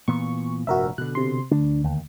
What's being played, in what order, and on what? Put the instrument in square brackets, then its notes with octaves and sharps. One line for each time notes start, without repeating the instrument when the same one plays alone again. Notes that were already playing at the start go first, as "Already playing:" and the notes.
[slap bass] A#2 E3 B3 [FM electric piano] C#6
[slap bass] F1 G2 A#2 [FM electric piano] F#4 A#4 E5
[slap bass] B2 D3 [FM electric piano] F#6
[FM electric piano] C3 C6
[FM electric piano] D2 [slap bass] D4
[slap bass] D#2